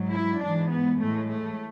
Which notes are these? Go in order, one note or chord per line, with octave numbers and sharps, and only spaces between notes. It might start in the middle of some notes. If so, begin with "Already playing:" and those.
Already playing: G#2 F#3
E4
G#2 E3 G#3 D4
B3
A2 E3 G#3 A3
A3